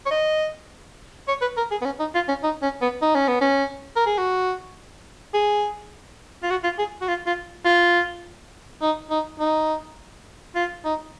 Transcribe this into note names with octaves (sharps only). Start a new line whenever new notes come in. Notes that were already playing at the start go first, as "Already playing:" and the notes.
C#5
D#5
C#5
B4
A#4
G#4
B3
C#4
D#4
F4
C#4
D#4
C#4
B3
D#4
C#4
B3
C#4
A#4
G#4
F#4
G#4
F4
F#4
F4
G#4
F#4
F4
F4
F4
D#4
D#4
D#4
F4
D#4